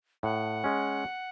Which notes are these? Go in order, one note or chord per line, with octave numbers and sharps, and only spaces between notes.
A2 F#5
G#3 C#4